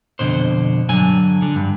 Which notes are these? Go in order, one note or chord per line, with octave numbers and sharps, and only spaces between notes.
F2 B2 D3 C5
G2 D3 F#3 G#5
D3
G2